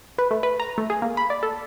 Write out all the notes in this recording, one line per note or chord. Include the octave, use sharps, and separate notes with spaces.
B4
A3
B4
A#5
A3
G#4
A#3
B5
D5
A4